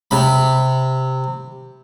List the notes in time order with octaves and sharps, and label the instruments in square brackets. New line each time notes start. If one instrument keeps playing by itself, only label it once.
[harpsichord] C3 B5